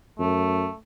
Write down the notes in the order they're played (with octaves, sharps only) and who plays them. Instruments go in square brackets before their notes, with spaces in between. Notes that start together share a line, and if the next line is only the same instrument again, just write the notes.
[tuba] F#2 [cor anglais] A3